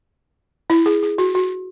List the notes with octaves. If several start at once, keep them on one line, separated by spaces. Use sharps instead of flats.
E4
G#4
G#4
F#4
F#4